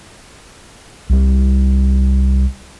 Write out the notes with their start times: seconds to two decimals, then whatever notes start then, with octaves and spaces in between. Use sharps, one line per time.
1.09 C2 G3